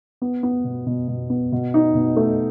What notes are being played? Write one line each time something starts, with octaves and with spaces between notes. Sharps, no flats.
B3
B3
B2
B2
B2
B3
B2
D#4
B2
A3